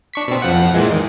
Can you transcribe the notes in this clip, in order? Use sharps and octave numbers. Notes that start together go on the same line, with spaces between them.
D4 C#6 B6
B2 C4
F2 F3 F#5
A#2 E3 G#3
D#3